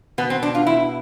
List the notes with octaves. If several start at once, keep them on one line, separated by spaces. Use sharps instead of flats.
B2 B3
C4
D4
F4
E4